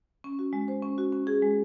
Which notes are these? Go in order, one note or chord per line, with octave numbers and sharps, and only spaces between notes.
C#4
F#4
G#3
C5
C#4
F#4
C#4
G#4
G#3